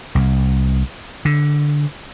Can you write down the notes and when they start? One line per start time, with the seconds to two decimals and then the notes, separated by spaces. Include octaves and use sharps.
0.15 C2
1.25 D3